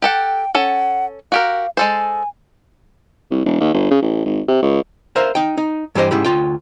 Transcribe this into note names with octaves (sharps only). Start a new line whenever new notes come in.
G4 A4 F#5 G5
C#4 A4 F#5
F#4 G4 A#4 F5
G#3 A4 C5 G#5
C2
E1
D#2
G1
C#3
A1
G#1
C3
C#2
A#4 C5 E5 F5
D#4 G5
D#4
G2 E3 G4 C5 D#5
G#2 C#3 E4 G4 B5
D2 G#2 F4 G5